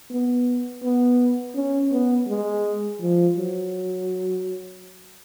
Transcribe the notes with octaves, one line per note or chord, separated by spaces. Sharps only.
B3
B3
C#4
B3
G#3
F3
F#3